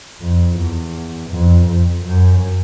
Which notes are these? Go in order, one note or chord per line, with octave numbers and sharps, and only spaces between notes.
F2
E2
F2
F2
F#2